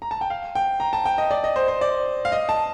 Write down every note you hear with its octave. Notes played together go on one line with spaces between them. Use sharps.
A#5
A5
G5
F5
G5
A#5
A5
G5
D#5
D5
D#5
C5
C5
D5
F5
D#5
A5